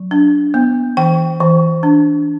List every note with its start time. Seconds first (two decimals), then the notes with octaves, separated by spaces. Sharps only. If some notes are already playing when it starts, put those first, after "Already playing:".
Already playing: F#3
0.11 D4
0.54 B3
0.97 E3 G5
1.40 E3
1.83 D4